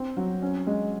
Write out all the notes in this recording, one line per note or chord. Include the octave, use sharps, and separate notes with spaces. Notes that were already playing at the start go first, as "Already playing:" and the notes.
Already playing: C4
F#3
C#4
G#3